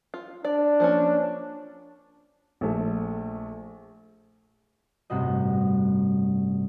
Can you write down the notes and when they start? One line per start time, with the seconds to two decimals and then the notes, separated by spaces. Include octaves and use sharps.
0.14 F4
0.45 D4 D5
0.80 F3 A#3 C#4
2.61 A#1 A3
5.10 A1 G2 C3 F#4 D#5